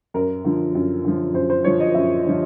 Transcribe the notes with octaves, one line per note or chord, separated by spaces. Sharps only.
F#2 A#4
D3 F3
F#2
D3 F3
F#2 C5
C5
D3 F3 C#5
D#5
F#2 E5
D3 F3